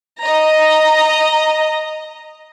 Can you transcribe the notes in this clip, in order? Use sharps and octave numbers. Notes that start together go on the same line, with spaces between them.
D#5 A#5